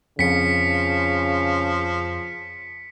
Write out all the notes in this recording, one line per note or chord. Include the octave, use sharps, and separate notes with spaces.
F2 C#3 F3 B6 C#7